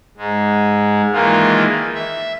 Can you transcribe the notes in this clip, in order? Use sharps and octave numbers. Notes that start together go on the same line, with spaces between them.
G#2 G#3
D#3 E3 G#3 A#3 D#4 F4
E5